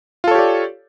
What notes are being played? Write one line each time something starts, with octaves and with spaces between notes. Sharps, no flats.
F4 G4 A4 C#5 D5